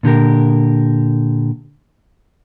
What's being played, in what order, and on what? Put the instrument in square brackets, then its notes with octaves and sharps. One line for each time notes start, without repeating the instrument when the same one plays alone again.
[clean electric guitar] A#2 D3 G4 A#4